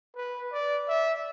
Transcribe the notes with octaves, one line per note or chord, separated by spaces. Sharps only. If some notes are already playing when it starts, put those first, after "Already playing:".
B4
D5
E5